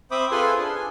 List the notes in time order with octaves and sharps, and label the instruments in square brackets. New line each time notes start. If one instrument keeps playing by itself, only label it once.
[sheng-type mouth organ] C4 C5 E5 B5 D6 D#6
F4 G#4 A4 B4 G#5 C6
D4
G#5